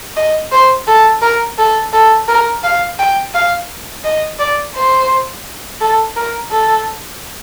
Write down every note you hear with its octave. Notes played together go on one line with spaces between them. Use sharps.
D#5
C5
A4
A#4
A4
A4
A#4
F5
G5
F5
D#5
D5
C5
A4
A#4
A4